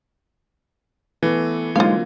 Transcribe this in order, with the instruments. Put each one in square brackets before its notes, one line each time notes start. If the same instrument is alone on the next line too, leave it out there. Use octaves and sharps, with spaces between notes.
[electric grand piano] E3 [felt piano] A3 B3
[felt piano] D3 F#3 A#3 [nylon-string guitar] G#3 C4 D#4 [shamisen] F4 F5